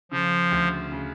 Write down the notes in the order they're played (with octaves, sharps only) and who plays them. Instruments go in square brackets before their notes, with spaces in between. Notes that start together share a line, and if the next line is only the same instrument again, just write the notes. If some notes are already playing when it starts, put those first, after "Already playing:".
[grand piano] C#3 [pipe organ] F3
[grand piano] D2
C#3